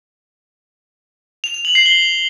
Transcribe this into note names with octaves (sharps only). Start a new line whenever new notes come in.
F7
F7
F#7
C7
G7